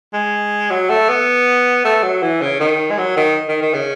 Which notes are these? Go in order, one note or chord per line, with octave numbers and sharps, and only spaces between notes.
G#3
F#3
A3
B3
A3
F#3
E3
C#3
D#3
G#3
F#3
D#3
D#3
D#3
C#3